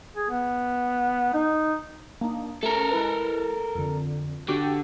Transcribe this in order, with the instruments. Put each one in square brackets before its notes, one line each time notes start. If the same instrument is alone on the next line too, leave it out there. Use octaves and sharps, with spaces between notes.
[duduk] G#4
B3
D#4
[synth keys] A#3 D4 D#4
[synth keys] A3 C#4 [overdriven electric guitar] A4 A#4
[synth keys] G#3 E4 B4
F2 D3
[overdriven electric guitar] D3 [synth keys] F#4 G4 G5